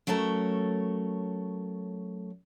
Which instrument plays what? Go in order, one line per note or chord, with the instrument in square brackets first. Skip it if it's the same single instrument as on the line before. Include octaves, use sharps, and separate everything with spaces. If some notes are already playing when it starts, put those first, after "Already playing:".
[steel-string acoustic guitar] F#3 A3 C#4 A4 A#4